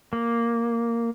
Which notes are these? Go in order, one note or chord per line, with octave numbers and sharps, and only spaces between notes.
A#3